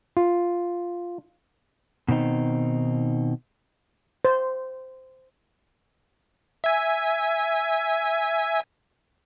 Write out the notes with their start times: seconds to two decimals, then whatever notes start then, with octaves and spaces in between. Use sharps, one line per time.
0.17 F4
2.08 B2 D#3 C4 D#4
4.25 C5
6.64 E5 G#5